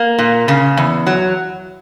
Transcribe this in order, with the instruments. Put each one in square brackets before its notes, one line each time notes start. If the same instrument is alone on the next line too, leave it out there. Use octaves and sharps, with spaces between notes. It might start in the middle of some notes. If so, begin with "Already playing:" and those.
Already playing: [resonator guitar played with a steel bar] A#3
A#2
C#3
E2
F#3